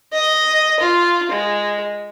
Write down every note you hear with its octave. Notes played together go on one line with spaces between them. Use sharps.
D#5
F4
G#3